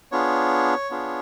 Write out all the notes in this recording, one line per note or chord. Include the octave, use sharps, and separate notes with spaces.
B3 D4 F4 G#4 C#5
B3 D4 F4 G#4